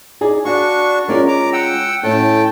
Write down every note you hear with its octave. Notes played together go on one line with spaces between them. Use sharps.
D#4 G#4 D5
D4 F#4 F5 C#6
G#3 C#4 F4 A#4 D5
A#5 D6
F#5 G5 E6
A2 A3 C#4 G5 A5